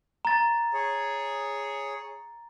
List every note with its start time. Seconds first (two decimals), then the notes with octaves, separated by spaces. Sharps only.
0.25 A#5 A6
0.73 G#4 C#5